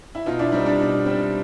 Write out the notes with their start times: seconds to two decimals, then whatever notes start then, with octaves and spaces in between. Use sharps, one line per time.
0.15 E4
0.26 B2 D#4 F4
0.39 D4 E4
0.52 G3 C4 D#4
0.66 D4
0.79 B2 D#4
1.05 G3 C4